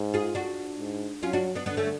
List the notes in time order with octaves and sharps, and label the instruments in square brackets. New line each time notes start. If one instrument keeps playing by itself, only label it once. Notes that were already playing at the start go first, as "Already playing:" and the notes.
Already playing: [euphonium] G#2
[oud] F4 G#4
D4 F#4
[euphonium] G#2
[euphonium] F#3 [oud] C#4 F4
[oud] D4 F#4
B3 D4
[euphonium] D3 [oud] B3 D4
[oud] A3 C#4